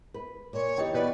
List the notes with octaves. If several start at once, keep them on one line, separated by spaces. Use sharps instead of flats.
B4
A#2 C#5
E3 D#4 G4 D#5 G5
B2 B4 D5